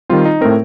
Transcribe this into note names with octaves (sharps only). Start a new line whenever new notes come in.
D#3 G3 C4 F4
D#4
A2 A3 C4 A#4